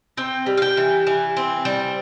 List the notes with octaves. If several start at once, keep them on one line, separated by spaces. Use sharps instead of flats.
C4 G5
G3
F5
G5
E3
E3
C4
G3